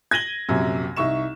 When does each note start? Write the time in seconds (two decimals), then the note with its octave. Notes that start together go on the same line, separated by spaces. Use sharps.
0.11 G#6 A#6 D#7 F#7 G7
0.49 A#1 F#2 C3
0.96 C2 D#4 E5 C#6 E7